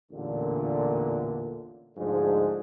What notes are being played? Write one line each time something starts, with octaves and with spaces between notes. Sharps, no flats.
A1 E2 A#2 D3
D2 G#2 F3 G#3 D4 G#4